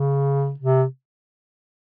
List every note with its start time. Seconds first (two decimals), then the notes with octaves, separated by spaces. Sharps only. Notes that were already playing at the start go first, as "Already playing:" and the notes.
Already playing: C#3
0.59 C3